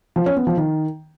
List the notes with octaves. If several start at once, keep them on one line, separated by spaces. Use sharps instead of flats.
F3
C#4
B3
F3
D#3